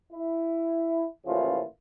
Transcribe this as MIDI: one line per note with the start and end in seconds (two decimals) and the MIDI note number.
0.13 1.06 64
1.26 1.63 33
1.26 1.63 46
1.26 1.63 49
1.26 1.63 53
1.26 1.63 64
1.26 1.63 65